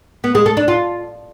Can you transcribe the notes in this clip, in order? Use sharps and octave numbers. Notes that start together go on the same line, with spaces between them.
B3
G#3
A4
D4
F4